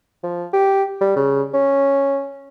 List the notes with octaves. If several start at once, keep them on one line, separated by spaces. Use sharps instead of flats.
F3
G4
G3
C#3
C#4